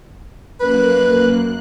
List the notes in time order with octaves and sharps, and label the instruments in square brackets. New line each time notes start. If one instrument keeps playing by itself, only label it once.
[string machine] F#2 A#3 F#6 [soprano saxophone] B4